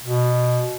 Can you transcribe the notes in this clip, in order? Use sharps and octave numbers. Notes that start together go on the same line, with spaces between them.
B2